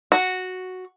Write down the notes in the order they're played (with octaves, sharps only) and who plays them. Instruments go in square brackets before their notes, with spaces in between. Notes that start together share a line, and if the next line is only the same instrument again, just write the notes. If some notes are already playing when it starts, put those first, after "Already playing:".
[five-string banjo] F#4